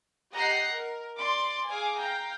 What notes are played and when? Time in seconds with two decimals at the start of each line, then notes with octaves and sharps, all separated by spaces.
0.34 G4 D#5 F#5 A#5 A#6 C7
0.72 A#4
1.17 D5 C6 D6
1.70 G#4 F5 G#5 D6
2.00 F5 G5 A#5